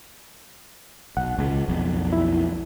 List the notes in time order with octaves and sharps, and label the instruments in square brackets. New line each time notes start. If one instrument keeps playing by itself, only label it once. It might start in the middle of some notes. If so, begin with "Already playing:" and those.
[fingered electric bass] B1 [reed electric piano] F#5
[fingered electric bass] C#2
B1 F2
[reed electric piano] E4